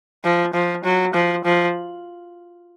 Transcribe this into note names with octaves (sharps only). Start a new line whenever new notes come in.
F3
F3
F#3
F3
F3